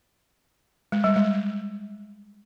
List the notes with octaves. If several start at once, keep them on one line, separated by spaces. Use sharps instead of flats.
G#3
G3
G#3